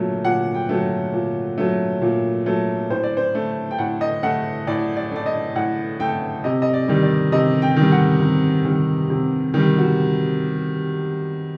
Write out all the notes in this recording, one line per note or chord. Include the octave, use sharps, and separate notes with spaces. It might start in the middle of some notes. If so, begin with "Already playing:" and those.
Already playing: A#2 F#3 A3
A#2 F#5
G5
F#3 A3
A#2
F#3 A3
A#2
F#3 A3
A2 C5
D5
C5
A3
G5
A2 F#5
D#5
A3 F#5
A2 D5
D5
A3 D5
D#5
A2 F#5
A3 G5
C3 D#5
D#5
D5
D#3 G3
D5
C3 D#5
G5
D#3 G3
F#5
C3
D#3 G3
C3
D#3 G3
F#4